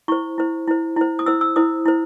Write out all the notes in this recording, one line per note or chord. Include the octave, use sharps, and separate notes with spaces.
E4 C5 C#6
E4 C5
E4 C5
E4 C5
D#6
E4 C5 E6
E6
E4 C5 D#6
E4 C5